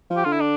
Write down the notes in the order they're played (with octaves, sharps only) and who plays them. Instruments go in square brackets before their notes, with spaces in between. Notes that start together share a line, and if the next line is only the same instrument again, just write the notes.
[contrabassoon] F3
[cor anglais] G4
[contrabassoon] D3 [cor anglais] F4
[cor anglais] E4
D4